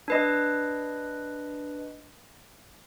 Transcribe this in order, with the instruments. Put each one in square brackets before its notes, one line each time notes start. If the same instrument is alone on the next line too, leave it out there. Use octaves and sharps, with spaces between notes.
[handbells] D4 B4 D#5